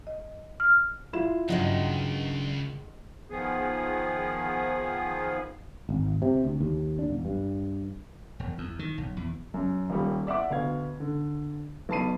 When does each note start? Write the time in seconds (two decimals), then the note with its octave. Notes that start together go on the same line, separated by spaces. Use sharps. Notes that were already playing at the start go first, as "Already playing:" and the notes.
0.07 D#5
0.60 F6
1.13 G#3 E4 F4 E7
1.48 C#2 G2 D#3 F#3 G#3 D4 F#5
3.30 D#3 F3 B3 G#4
5.89 G#1
6.22 C3
6.44 D2
6.60 D#2
6.99 D4
7.10 E1
7.25 G2
8.40 E1
8.58 E2
8.79 D#3
8.98 B1
9.17 E2
9.54 F#2
9.90 D#1 G3 A#3
10.27 D5 E5 F#5 D6
10.50 D2 B2 F5 G#6
11.00 D3
11.89 B1 B2 A5 B5 C7 D#7